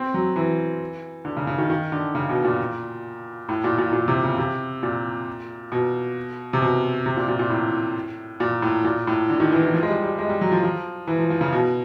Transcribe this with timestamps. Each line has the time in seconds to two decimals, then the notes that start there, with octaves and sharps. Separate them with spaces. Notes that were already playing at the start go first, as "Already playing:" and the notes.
Already playing: C4
0.14 F#3
0.36 E3
1.25 D3
1.37 C#3
1.47 C#3
1.58 D#3
1.70 D#3
1.92 D3
2.15 C#3
2.29 B2
2.45 A#2
3.49 A2
3.64 A#2
3.78 A#2
3.93 A#2
4.08 C3
4.23 C#3
4.38 C3
4.83 A#2
5.72 B2
6.53 C3
6.62 B2
7.06 C3
7.17 A#2
7.28 A#2
7.39 A#2
7.50 A2
8.40 A#2
8.62 A2
8.84 A#2
9.07 A2
9.30 D3
9.40 D#3
9.52 E3
9.63 E3
9.74 F3
9.83 G#3
9.89 G3
10.03 G3
10.19 G#3
10.29 G3
10.41 F#3
10.52 F3
10.64 F3
11.07 E3
11.19 F3
11.30 F3
11.41 C#3
11.52 B2